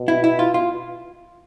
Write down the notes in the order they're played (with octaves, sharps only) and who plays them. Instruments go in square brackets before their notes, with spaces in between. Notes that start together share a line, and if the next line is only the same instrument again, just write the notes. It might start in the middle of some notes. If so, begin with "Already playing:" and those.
Already playing: [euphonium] B2
[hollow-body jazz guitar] E4
E4
F4
F4